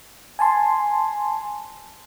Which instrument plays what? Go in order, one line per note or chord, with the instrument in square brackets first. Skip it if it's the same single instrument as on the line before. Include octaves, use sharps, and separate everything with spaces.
[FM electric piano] G#5 A5 C6